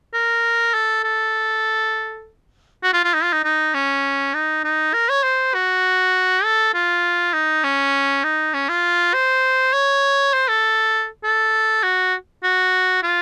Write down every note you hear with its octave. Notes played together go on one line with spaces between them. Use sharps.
A#4
A4
A4
F#4
F4
F4
D#4
F4
D#4
D#4
C#4
D#4
D#4
A#4
C#5
C5
F#4
A4
F4
D#4
C#4
D#4
C#4
F4
C5
C#5
C5
A4
A4
F#4
F#4
F4